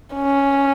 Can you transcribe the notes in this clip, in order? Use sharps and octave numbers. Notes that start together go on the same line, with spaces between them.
C#4